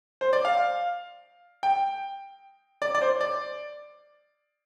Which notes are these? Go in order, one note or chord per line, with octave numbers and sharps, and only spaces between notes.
C5
D5
F5
G5
D5
D5
C5
D5